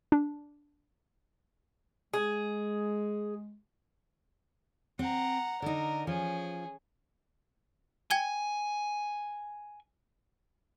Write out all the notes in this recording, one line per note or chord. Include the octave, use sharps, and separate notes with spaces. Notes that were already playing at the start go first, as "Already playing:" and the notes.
D4
G#3 G#4
C4 F#5 A#5
D3 D#4 A#4
F3 C#4 G#4
G5 G#5 G#6 G7